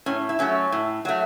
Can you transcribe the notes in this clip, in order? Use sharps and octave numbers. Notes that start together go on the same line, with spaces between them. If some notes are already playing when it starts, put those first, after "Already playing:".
A2 C#4
E4
F#3 A3 C#4
A2
F#3 A3